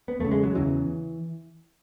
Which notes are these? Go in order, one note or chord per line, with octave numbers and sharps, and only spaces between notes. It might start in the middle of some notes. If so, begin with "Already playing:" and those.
B3
E2 C#3 A3
G#3
F#3
E2 C#3 E3